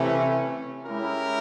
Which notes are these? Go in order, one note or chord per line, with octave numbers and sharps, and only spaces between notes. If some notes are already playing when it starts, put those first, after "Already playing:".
Already playing: C3 E3 A3 C#4
G#3 C#4 E4 G4 A#4